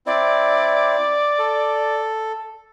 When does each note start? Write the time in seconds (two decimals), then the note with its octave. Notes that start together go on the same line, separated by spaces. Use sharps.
0.06 C4 E4 D5
1.39 A4